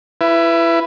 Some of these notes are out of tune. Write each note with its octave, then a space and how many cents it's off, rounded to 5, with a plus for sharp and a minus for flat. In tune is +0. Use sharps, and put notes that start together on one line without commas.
E4 +25 B4 +0